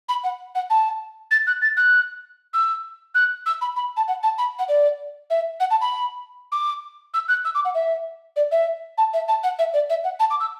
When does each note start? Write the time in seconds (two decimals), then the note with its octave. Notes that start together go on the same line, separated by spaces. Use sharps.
0.08 B5
0.24 F#5
0.55 F#5
0.70 A5
1.31 A6
1.47 F#6
1.62 A6
1.77 F#6
2.54 E6
3.14 F#6
3.46 E6
3.61 B5
3.76 B5
3.97 A5
4.08 F#5
4.23 A5
4.38 B5
4.59 F#5
4.68 D5
5.30 E5
5.60 F#5
5.70 A5
5.81 B5
6.52 D6
7.14 E6
7.28 F#6
7.45 E6
7.55 D6
7.65 F#5
7.74 E5
8.36 D5
8.51 E5
8.98 A5
9.13 E5
9.28 A5
9.43 F#5
9.59 E5
9.73 D5
9.90 E5
10.04 F#5
10.19 A5
10.30 D6
10.40 E6